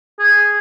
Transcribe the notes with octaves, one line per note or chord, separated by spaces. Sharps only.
G#4